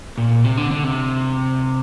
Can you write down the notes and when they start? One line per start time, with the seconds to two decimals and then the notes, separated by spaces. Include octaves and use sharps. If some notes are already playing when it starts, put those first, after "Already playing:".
0.18 A#2
0.44 C3
0.57 D3
0.71 D3
0.84 C3